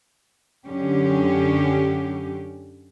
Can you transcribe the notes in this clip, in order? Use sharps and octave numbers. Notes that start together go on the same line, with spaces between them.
F#2 D3 C#4 G4